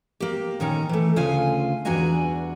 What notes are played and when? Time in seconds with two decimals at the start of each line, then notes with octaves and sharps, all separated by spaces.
0.20 A#3 G4
0.60 A#2 D#3 C#4 A#5
0.89 E3 A3
1.16 D2 C#3 F4 F5 G#5
1.85 E2 G2 D4 F#4 G#5 A#5